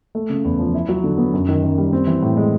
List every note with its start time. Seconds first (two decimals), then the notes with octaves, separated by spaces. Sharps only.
0.15 A3
0.30 C#3
0.45 E2
0.59 F3
0.74 E4
0.89 F#3
1.04 D3
1.18 B3
1.33 F#2
1.48 D#3
1.63 F#2
1.78 G3
1.93 C4
2.07 E3
2.23 A2
2.37 G#3